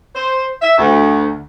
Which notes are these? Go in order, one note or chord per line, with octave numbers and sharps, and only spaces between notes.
C5
E5
D2